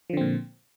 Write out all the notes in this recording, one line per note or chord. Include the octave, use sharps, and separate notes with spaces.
A#2 D3 F3 C4